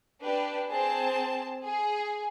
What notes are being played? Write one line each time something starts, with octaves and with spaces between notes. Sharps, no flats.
D4 G4 B4
C4 G#4 C5 A5
G#4